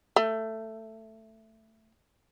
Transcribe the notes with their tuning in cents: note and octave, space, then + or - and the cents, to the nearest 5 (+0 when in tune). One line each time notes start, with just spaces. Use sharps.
A3 +10